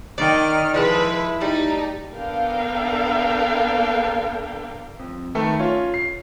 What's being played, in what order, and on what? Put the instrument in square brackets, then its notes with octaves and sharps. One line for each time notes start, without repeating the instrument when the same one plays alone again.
[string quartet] D#3 F6 [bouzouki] D5 G5
[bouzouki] F3 G#3 A4 [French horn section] E4 [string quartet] B4
[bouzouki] G3 A3 [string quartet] D#4
[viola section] B3 D4 A4 A#4 F5 G5
[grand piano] F2
D#3 A3 A4 B4
C#4 F4 C#5
C7